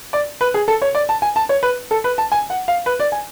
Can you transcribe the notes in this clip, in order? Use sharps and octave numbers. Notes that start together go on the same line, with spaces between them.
D5
B4
G#4
A4
C#5
D5
A5
G#5
A5
C#5
B4
A4
B4
A5
G#5
F#5
F5
B4
D5
G#5